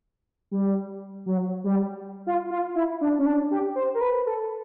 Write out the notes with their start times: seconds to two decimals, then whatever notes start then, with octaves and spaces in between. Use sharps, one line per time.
0.51 G3
1.26 F#3
1.64 G3
2.27 F4
2.50 F4
2.75 E4
3.01 D4
3.19 C#4
3.26 D4
3.51 G4
3.76 C5
3.95 A#4
4.01 B4
4.26 A4